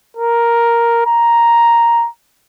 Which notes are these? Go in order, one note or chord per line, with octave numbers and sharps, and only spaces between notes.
A#4
A#5